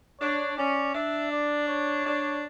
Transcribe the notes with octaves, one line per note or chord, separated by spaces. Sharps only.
D4 C#5
C#4 D5
D4 E5
D5
C#5
D4